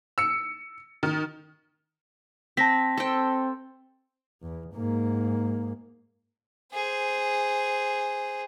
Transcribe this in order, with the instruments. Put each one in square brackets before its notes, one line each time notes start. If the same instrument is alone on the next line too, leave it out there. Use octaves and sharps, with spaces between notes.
[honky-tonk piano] E6 C#7
D#3
[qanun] C4 [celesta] A5 A#6 B6
[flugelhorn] C4 [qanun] A4 G5
[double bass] E2
G#2 A#3
[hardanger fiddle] G#4 C5